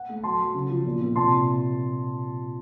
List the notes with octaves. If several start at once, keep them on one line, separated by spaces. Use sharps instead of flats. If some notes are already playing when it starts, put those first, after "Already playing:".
Already playing: F#5
A3
F#3 A5 C6
F#3
C#3
F3
A#2
A#2
C3 A5 C6